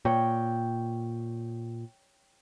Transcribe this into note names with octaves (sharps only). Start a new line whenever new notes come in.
A#2 C#5 G5